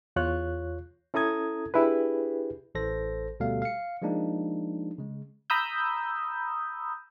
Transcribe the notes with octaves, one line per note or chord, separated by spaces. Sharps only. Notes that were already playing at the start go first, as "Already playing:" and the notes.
E2 F4 C#5 F#6
C#4 E4 A4 A#5 D#6 G#6
D4 E4 G4 G#4 B4
A1 E3 A4 C5 A#6
D2 B2 G3 A3 A4 F5
F5 C#7
F3 G#3 A#3 D4 D#4
C#3 G#3
A#5 B5 D#6 E6 G6